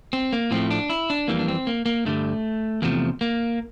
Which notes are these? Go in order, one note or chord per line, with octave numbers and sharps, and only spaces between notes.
C4
A#3
A2 F3 A3 C4
D4
E4
D4
F2 E3 G3 A#3
D4
C4
A#3
A#3
G2 D3 G3 A3
E2 C3 F3 A3 A#3
A#3